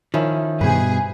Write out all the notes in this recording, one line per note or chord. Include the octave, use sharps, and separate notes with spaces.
D#3 F3 C#4 E4
G2 B2 G#4 B4 C5